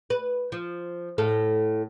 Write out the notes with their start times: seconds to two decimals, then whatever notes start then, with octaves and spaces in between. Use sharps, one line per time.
0.10 B4
0.52 F3
1.18 A2 A4 F5